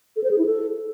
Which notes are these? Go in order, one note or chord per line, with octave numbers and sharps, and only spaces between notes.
A4
C5
G#4
E4
A4